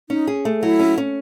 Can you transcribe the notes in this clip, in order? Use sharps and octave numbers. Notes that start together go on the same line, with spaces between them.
C#4 D#4
G#4
A3
F#3 E4
C#4
C#4